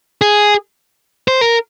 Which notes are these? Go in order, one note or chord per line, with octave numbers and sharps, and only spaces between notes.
G#4
C5
A#4